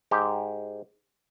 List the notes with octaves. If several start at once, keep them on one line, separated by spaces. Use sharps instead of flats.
G#2 G4